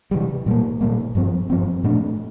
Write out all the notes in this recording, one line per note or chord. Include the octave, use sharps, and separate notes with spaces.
C3 E3 G3
A#2 G3 A#3
A#2 G3 A#3
G2 F3 C4
G2 F3 C4
A#2 A3 D4